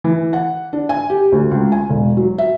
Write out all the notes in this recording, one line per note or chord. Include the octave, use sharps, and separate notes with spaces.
E3
F#5
D4
G#5
G4
D2
C#2
G#5
E1
F#3
E5